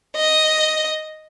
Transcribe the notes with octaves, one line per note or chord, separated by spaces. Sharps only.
D#5